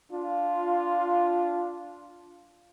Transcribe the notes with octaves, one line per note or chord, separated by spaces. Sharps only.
D4 F4